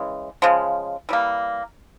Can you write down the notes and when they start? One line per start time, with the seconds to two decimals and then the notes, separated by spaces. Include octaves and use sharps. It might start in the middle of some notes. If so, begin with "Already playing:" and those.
Already playing: C#3 E3 G#3
0.42 C#3 F3 G#3
1.09 E3 G3 A#3